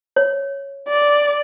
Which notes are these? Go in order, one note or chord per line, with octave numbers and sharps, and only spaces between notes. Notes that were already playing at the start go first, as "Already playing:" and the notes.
C#5
D5